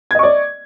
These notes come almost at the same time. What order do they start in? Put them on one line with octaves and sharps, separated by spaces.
G#6 D#5 C#6 D5